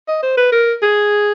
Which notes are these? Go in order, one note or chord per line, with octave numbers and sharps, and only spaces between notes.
D#5
C5
B4
A#4
G#4